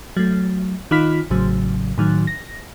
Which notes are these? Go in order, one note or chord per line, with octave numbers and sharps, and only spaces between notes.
F#3 A3
D#3 D#4 F4 B5 F6 B6
A1 A2 C#3 F#3
A2 D#3 F#3
A#6